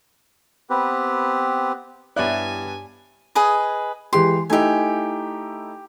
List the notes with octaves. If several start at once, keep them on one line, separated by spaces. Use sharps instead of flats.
B3 C4 G4 B4
G2 B3 E4 G4 C#5 D5 G#5 F#6
G#4 B4 D#5
E3 G#3 G4 C6
A3 D#4 E4 G4 G#5